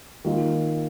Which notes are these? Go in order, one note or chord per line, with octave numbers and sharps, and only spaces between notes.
D#3 A#3 F4